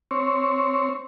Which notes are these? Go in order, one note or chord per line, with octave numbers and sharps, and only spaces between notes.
C4 C#5